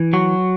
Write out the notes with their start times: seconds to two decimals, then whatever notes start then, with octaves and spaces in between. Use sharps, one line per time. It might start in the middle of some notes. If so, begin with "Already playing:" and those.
Already playing: E3
0.13 F#3 F#4